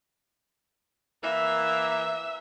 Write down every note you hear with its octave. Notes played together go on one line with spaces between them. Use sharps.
E3 A#3 E5